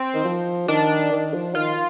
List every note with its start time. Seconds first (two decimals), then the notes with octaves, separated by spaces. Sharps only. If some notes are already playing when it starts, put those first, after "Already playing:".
Already playing: C4
0.14 D#3
0.25 F3
0.68 D#3 D4
1.12 D#3
1.34 F3
1.55 D#3 F4